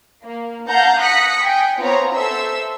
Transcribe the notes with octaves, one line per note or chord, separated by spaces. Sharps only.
A#3
F5 F#5 A5 A#5 G6
D#6 F#6 A#6 B6 C#7
G5 G#5
B3 C4 F4 C#5 A#5
A4 C5 E5 E6